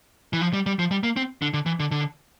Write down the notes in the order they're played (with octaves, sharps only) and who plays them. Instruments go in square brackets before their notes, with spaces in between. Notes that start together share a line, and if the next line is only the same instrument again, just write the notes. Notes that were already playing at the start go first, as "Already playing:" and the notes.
[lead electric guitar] E3
F3
G3
G3
F3
G3
A#3
C4
D3
D3
E3
D3
D3